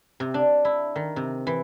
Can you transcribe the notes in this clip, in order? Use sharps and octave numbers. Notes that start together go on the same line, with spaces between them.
C3
D4
E4
D#3
C3
E3